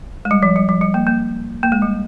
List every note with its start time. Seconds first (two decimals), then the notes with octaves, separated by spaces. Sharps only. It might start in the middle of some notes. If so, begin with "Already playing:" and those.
0.25 G#3
0.31 G3
0.43 F3
0.56 G3
0.69 F3
0.81 G3
0.94 A#3
1.07 A#3
1.63 A#3
1.72 G#3
1.82 G3